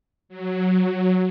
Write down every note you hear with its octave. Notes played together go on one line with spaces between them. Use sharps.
F#3